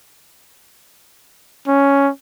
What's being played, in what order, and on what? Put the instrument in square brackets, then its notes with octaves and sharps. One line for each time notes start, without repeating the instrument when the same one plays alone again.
[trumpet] C#4